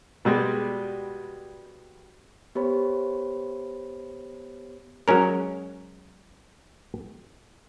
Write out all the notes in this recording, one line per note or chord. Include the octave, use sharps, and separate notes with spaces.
B2 G3 G#3
B3 G4 C5 C#5 B5
F#3 G#3 C#4 A#4